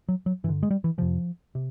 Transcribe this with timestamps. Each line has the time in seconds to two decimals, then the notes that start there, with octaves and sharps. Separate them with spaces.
0.09 F#3
0.26 F#3
0.44 G2 E3
0.49 D3
0.63 G#3
0.71 G3
0.84 E3
0.98 F2 C3 F3
1.55 C3